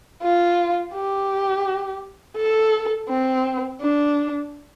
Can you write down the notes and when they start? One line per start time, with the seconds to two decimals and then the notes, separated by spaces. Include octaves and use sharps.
0.23 F4
0.94 G4
2.37 A4
3.09 C4
3.81 D4